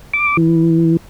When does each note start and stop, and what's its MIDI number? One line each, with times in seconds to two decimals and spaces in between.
0.14 0.37 86
0.37 0.97 52